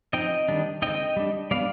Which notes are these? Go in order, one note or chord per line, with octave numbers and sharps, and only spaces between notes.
F3 C4 D#4 D#5 G5
D#3 G3 D4
D3 G#3 C4 D#4 D#5 G5
G3 D4
G3 B3 D4 D5 F5